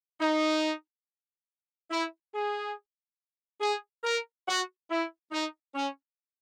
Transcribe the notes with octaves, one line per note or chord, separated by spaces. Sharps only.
D#4
E4
G#4
G#4
A#4
F#4
E4
D#4
C#4